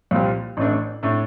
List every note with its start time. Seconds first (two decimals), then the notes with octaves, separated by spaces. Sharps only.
0.11 C2 A#2 F3 C4 G4
0.57 A1 A2 A3 D4
1.03 A2 A3 D4